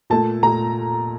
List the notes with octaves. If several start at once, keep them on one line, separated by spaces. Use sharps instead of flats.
A#2 A3 A5
A#2 A3 A#5